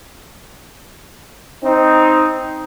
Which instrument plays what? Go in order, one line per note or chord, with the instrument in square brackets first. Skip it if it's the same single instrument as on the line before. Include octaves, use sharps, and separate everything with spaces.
[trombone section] C4 D#4